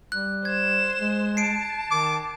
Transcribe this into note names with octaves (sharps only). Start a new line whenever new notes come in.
G3 F#6
C5 G#6 E7
G#3
A5 C7 D7
D#3 D6